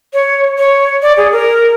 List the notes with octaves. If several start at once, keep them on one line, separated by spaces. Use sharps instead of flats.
C#5
C#5
D5
G#4
A#4